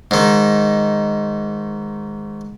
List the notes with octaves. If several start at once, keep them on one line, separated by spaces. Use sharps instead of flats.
G#2 D#3